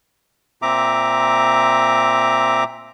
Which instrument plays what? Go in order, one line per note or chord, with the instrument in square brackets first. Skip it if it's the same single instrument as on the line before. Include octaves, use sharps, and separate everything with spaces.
[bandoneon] A#2 C4 E5 A#5 D6